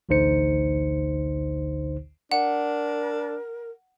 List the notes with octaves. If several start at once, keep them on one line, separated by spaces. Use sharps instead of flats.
A1 D2 D3 D#4 C5 C#7
D4 A#4 F#5